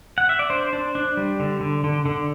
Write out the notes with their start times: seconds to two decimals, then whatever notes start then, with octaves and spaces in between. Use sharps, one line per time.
0.18 F#5
0.29 E5
0.39 D5
0.50 D4 C5
0.73 D4
0.95 D4
1.17 G3
1.40 D3
1.61 D3
1.84 D3
2.06 D3